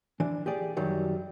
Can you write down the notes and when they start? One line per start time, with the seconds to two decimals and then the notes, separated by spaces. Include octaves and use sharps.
0.20 E3 D4
0.46 G4 G#4 D5
0.77 F#2 D#3 F#3 G3